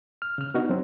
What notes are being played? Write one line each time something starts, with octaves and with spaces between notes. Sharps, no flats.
F6
C#3 F6
B3 D4 D#4 F#4
F#3 C4